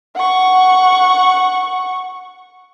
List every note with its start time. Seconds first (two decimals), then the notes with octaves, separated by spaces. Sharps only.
0.16 F#5 C#6